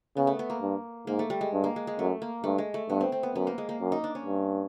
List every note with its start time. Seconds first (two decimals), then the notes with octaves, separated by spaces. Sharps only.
0.17 C#3 B3
0.27 A3
0.39 B3
0.50 A#3
0.61 G2
1.07 G#2 A#3
1.19 A3
1.30 G3
1.41 G#3
1.53 G2
1.64 A#3
1.76 G#3
1.87 G#3
1.98 F#2 A3
2.22 A#3
2.44 G2 A3
2.58 G#3
2.74 A3
2.89 G2 B3
3.01 C4
3.12 C4
3.23 B3
3.35 F#2 B3
3.47 A#3
3.58 G#3
3.69 A#3
3.81 F#2
3.92 D#4
4.04 D4
4.15 C#4
4.25 G2